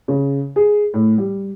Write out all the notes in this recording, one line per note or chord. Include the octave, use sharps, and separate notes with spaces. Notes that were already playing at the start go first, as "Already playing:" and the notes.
C#3
G#4
A2
G3